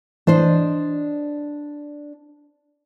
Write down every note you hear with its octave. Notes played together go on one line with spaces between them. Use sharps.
E3 D4 C5 D#5